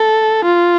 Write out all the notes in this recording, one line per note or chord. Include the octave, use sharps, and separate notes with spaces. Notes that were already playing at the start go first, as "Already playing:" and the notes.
Already playing: A4
F4